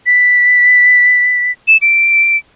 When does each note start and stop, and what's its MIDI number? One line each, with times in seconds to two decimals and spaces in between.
0.06 1.51 95
1.68 1.77 100
1.82 2.36 98